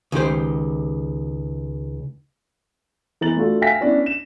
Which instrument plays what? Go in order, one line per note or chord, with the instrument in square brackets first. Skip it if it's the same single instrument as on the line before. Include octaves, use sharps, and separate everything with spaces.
[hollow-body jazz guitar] C#2 D#3 G4 C5
[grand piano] E3 B3 A#5 A6 F#7
A3 D4 F4 F#4 A4
E5 F5 G5 G#5 A#6 B6
B3 C#4 D4 E4
E7